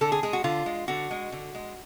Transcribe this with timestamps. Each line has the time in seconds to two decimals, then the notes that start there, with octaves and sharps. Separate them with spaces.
0.01 D3 A4
0.12 G#4
0.23 G#3 G#4
0.33 F#4
0.44 D3 F4
0.66 G#3
0.88 D3 F#4
1.11 G#3
1.32 D3
1.55 G#3